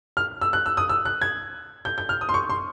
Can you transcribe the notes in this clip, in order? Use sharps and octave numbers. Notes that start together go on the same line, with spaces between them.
F6
E6
F#6
E6
D#6
E6
F#6
G#6
G6
G6
F6
D#6
C6
C#6
C6